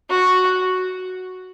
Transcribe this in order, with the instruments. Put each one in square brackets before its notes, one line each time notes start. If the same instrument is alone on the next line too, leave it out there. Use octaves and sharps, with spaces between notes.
[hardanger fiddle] F#4